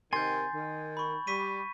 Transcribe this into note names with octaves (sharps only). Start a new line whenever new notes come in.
C3 D#3 G#5 C6 G6 A6
D#3
B5 C#6
G3 C#6 B6 D#7